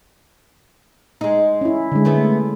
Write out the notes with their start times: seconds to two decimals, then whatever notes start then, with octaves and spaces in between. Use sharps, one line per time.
1.21 G#3 D#4
1.61 C#4 E4
1.92 D3 G#3
2.05 A3 B3